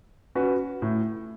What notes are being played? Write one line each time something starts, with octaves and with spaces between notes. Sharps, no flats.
C#4 F#4 B4
A2